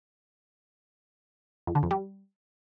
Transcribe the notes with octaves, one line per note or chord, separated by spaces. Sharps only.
F2
D3
F2
G3